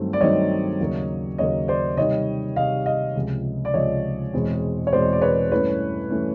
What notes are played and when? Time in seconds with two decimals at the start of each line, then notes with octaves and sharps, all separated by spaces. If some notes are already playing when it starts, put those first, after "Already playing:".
Already playing: G2 D#3 F#3 A3 C4
0.13 D5
0.21 G2 D#3 F#3 A3 C4 C#5 D#5
0.80 D#2 C#3 F#3 A#3
1.38 D#2 C#3 F#3 A#3 C#5 D#5
1.68 C5 D5
1.97 C3 D#3 G3 C#5 D#5
2.56 C3 D#3 G3 D#5 F5
2.86 D#5 F5
3.15 C#2 C3 F3
3.65 D5
3.74 C#2 C3 F3 C#5 D#5
4.33 E2 B2 G#3 C4
4.87 C#5
4.92 E2 B2 G#3 C4 C5 D5
5.13 D5
5.22 B4 C#5
5.52 G2 E3 A3 C#4 B4 C#5
6.10 E3 A3 C#4